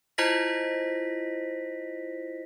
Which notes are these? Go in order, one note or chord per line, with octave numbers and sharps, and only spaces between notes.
E4 F4 C5 D#5 A#6 B6